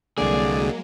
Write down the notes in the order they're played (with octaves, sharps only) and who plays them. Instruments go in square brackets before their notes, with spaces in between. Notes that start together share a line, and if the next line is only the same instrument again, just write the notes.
[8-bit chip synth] C2 D3 [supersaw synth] F#3 G#3 A#3 [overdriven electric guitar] G#4 [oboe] D5